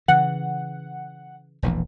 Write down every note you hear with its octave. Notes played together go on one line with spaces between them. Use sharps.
C#3 E3 F#5
E1 A#1 E3